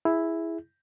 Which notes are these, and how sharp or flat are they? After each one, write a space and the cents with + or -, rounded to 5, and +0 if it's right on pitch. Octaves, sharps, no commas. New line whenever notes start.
E4 +0 G#4 -5